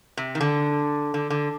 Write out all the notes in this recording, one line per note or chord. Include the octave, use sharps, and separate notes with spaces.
C3
D#3
D3
D3
D3